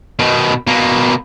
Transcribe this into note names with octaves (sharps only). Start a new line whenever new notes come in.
B2 D#3
B2 A#3